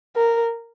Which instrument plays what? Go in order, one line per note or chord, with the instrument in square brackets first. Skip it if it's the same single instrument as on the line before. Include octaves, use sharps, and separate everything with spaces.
[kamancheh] A#4